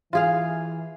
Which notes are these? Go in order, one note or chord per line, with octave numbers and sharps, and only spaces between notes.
E3 F4 G#4 F5